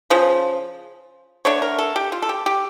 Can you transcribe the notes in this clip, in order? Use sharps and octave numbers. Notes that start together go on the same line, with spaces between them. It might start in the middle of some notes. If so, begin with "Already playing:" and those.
C#3 F3
D3 A3 D4 C#5
A#4
A4
G4
F4
A4
G4
G4